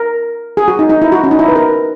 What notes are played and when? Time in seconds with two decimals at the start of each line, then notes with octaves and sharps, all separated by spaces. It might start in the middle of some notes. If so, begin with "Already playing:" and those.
Already playing: A#4
0.57 G#4
0.68 F#4
0.79 D#4
0.89 D#4
1.02 E4
1.12 F#4
1.24 C#4
1.31 D#4
1.39 E4
1.48 B4
1.56 A#4